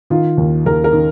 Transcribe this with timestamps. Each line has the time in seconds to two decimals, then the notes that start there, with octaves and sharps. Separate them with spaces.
0.10 D#3 F4
0.38 D#2
0.66 D#2 A#4
0.84 A#4
0.93 D#3